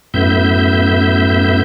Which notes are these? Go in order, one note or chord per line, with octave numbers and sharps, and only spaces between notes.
F#2 A2 B3 E5 G6